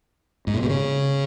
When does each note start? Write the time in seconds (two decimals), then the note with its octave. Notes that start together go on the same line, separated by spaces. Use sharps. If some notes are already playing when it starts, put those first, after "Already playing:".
0.47 G#2
0.54 A#2
0.62 B2
0.69 C#3